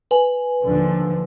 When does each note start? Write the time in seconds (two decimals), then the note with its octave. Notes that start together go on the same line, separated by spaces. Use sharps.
0.11 B4 G#5
0.63 D#2 D3 F3